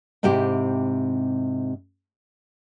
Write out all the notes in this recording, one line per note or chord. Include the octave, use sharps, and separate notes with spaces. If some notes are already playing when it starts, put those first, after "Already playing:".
G#2 C3 C4 E4 G4